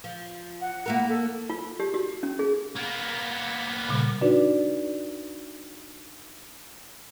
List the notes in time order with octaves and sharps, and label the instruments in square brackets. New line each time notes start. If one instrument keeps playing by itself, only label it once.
[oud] F3
[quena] F#5
[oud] A#3 E4 A#4
[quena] A4
[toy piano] F4
G4
F#4
C#4
G#4
[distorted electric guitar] A#3 B3
[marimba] A#2 C#3 G3
D4 D#4 F#4 B4 D5